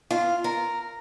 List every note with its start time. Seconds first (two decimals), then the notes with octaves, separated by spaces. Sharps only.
0.11 F4
0.44 A#4